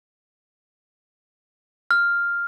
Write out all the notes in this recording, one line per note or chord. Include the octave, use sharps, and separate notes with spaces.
F6